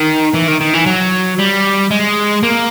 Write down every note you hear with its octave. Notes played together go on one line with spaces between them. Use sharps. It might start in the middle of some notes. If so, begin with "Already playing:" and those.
Already playing: D#3
E3
D#3
D#3
E3
F#3
G3
G#3
A#3